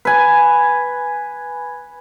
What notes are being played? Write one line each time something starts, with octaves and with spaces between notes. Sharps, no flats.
B4 G#5